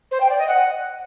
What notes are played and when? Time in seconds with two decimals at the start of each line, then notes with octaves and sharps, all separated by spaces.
0.11 C5
0.20 G5
0.29 D5
0.39 D#5
0.48 F#5